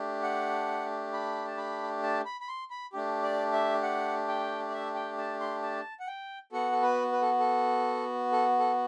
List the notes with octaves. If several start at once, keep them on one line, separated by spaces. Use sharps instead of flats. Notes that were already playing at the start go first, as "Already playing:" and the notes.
Already playing: A3 D4 G4
F#5
B5
A5
B5
A5
B5
B5
C6
B5
A3 D4 G4
D5
E5
F#5
G5
D5
E5
G5
A5
C6
A5
F#5
G5
B3 F#4 A4 F#5
A4
B4
B4
A4
A4
A4
A4